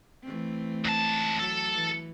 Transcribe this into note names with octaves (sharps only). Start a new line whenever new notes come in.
E3 A3 C4
C#2 A5
F#3 A4
E3